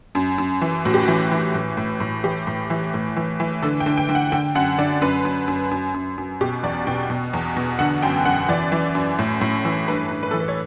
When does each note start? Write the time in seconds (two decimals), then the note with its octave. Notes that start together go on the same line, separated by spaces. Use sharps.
0.15 F#2
0.38 F#2
0.62 E3
0.85 A2 F#4
0.94 G4
1.03 E3 F#4
1.31 E3
1.55 A2
1.77 A2
2.00 A2
2.24 E3 G4
2.47 A2
2.70 E3
2.94 A2
3.16 E3
3.40 E3
3.62 D3 A4
3.80 G5
3.86 D3
3.98 G5
4.09 D3
4.15 F#5
4.32 D3 G5
4.55 F#2 F#5
4.78 D3 D5
5.02 F#2 B4
5.25 F#2
5.48 F#2
5.71 F#2
5.94 F#2
6.18 F#2
6.41 B2 G4
6.63 E2 D5
6.87 B2 G5
7.10 B2
7.33 E2
7.57 B2
7.79 D3 F#5
8.02 F#2 G5
8.25 F#2 F#5
8.49 E3 D5
8.72 E3
8.95 F#2
9.19 A2
9.41 A2
9.65 E3
9.88 G2 B4
10.11 G2
10.23 B4
10.31 E3 A4
10.40 B4
10.48 C#5